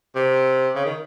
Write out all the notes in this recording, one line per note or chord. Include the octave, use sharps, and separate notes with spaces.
C3
C#3
D#3